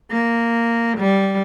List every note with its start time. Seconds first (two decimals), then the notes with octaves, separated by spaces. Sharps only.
0.10 A#3
0.98 G3